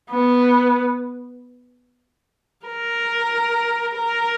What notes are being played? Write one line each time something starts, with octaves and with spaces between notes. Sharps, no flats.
B3
A#4
A#4